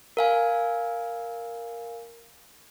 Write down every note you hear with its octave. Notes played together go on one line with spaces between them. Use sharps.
A#4 F5 G#5